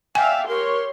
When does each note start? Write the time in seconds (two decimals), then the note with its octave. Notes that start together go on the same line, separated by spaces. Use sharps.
0.15 D5 E5 F5 G5 G#5
0.48 G4 A#4 C#5 C6